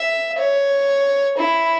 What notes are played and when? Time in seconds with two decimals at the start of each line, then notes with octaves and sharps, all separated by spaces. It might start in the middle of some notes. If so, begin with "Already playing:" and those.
Already playing: E5
0.38 C#5
1.38 E4